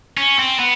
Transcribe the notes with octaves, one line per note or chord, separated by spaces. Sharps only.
C#4
C4
B3